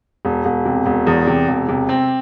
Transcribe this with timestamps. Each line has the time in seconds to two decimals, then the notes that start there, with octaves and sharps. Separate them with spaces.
0.25 E1
0.45 E1
0.65 C3
0.86 E1
1.07 E2
1.27 C3
1.48 E1
1.68 C3
1.89 C4